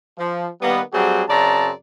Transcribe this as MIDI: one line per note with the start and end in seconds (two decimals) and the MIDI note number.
0.18 0.48 53
0.62 0.81 51
0.62 0.81 55
0.62 0.81 58
0.62 0.81 59
0.93 1.24 54
0.93 1.24 55
0.93 1.24 57
0.93 1.24 60
0.93 1.24 66
0.93 1.24 68
1.29 1.71 42
1.29 1.71 49
1.29 1.71 60
1.29 1.71 74
1.29 1.71 81
1.29 1.71 82